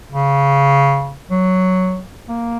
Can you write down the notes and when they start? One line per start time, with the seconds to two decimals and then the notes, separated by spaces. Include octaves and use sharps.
0.12 C#3
1.31 F#3
2.29 A#3